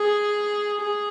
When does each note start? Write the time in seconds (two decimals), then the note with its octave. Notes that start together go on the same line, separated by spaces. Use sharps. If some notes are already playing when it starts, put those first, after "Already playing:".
Already playing: G#4
0.80 G#4